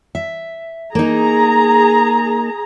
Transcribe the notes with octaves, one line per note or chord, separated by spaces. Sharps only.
E5
A#3 D#4 G#4 A#5